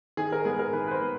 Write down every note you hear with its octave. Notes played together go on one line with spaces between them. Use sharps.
D#3 G#4
A#4
G#3 B3 G#4
A#4
D#3 B4
B4
C5
G#3 B3